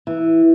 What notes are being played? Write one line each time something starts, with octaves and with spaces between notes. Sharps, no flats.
E3